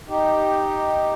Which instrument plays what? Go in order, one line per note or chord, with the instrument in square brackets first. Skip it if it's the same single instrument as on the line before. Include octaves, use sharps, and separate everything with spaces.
[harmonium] D#4 G4